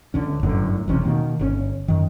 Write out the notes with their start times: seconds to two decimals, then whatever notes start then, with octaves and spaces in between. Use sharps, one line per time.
0.14 C#2 D3 C#4
0.43 G1 F#2 A2 D3
0.88 E1 A1 C3 C#4
1.04 B2 D#3 A#3
1.39 G1 C3 C#4
1.88 F#2 D#3